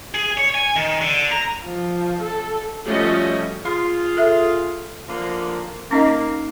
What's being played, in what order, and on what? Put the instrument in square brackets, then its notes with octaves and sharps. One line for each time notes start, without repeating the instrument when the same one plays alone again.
[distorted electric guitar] G#4
C#5
G#5
D#3
D3
A#5
[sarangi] F3
A4
[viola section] F3 G3 A3 C#4 F#4 D#5
[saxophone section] F4 G#4 [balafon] C6
[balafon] A4 E5
[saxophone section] D3 F3 A#3
[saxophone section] A#3 [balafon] C#4 D#4 D#5